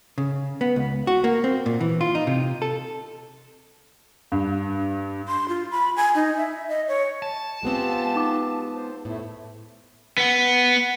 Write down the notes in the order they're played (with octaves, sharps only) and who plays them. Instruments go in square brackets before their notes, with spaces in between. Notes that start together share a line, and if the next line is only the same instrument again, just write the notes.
[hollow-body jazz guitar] C#3
B3
C#2
F#4
A#3
C4
A#2
E3
F4
D#4
C3
A4
[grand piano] G2
[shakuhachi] C6
F4
B5
G#5
D#4
E5
D#5
C#5
[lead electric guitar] A5
[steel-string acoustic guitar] G#3 B3 C4 [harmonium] F4 G4
[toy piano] D#4 D6
[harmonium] C5
[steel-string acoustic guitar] A2 [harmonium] A3 E4
[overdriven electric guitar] B3